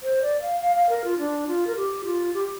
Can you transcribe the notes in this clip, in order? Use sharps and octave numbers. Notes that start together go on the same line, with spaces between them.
C5
D5
F5
F5
F5
A#4
F4
D4
F4
A#4
G4
F4
G4